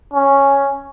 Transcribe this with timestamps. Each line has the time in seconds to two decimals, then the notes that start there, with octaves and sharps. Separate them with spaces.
0.14 C#4